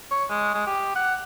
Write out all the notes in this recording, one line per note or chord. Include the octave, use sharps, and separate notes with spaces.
C#5
G#3
G#3
G4
F#5